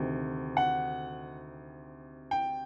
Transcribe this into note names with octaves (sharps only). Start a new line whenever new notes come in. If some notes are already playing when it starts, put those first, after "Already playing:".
Already playing: D2 C3 D#3
F#5
G5